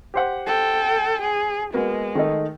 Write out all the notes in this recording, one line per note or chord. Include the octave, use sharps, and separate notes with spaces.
G4 C5 F#5
A4 G5
G#4
G#3 A#3 B3 F#4
D#3 A3 D#4